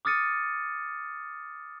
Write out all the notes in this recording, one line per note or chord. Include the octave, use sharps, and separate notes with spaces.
D6 D#6 F6 A6 C#7 D#7